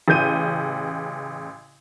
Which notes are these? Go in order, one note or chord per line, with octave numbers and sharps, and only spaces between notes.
A1 C#3 G6 D#7